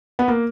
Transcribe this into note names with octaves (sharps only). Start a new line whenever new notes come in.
B3
A#3